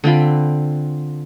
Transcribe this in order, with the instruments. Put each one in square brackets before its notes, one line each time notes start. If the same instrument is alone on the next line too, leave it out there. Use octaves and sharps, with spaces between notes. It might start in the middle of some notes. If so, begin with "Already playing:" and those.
[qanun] D3 C4 F4 B5